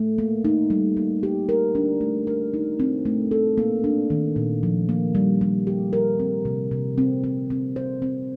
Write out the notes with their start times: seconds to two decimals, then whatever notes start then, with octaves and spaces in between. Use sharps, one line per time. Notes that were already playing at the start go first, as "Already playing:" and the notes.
Already playing: A3
0.18 A#3
0.44 D#4
0.70 G3
0.97 A#3
1.23 G4
1.49 A#4
1.75 D4
2.01 A3
2.27 A#4
2.54 D#4
2.80 C4
3.06 A3
3.31 A4
3.58 A#3
3.84 D4
4.10 D#3
4.36 A#2
4.63 F3
4.89 A#3
5.15 G3
5.41 G3
5.67 G4
5.93 A#4
6.19 C4
6.45 C3
6.72 C3
6.98 C4
7.24 C4
7.50 C4
7.76 C5
8.02 C4